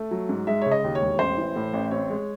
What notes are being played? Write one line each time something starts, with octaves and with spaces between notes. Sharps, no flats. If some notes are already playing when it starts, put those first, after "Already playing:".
Already playing: A3
F#3
G#2
G#3 E5
C#3 C#5
D#5
D#2
C#5
E1
A1 C5
E3
A2
A1
C4 C#5
G#3